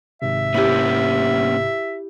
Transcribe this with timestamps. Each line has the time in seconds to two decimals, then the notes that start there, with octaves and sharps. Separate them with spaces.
0.22 G#1 G#2 C3 E5
0.54 A#3 B3 C#4 E4 G4